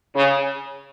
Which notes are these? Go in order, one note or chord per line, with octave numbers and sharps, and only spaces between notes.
C#3